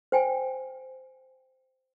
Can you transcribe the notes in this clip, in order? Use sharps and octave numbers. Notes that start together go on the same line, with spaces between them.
C5 G5 G#5